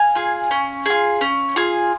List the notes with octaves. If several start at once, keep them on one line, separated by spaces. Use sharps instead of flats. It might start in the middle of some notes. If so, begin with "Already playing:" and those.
Already playing: F5 G#5
F4 G#4
C#4
F4 G#4
C#4
F4 G#4